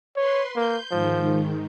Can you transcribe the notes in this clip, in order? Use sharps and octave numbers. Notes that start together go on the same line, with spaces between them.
B4 C#5 C6
A#3 G6
G#2 D#3 F3